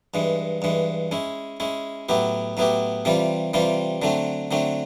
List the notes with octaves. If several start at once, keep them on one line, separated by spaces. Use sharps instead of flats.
G2 E3 G#3
G2 E3 G#3
G#3 C#4 E4
G#3 C#4 E4
A2 F#3 B3 E4 G4
A2 F#3 B3 E4 G4
C3 E3 G3 C4 F4
C3 E3 G3 C4 F4
D3 F#3 A3 C4
D3 F#3 A3 C4